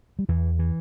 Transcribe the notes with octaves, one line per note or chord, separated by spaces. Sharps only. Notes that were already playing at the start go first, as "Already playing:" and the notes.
G3
E2 E3
E3